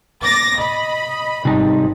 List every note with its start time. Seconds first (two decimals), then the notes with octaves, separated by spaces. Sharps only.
0.23 D6 A6 A#6
0.57 D#5 B5
1.45 G#1 C3 G3 D#4